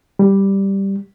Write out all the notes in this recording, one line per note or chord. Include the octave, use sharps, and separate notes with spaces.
G3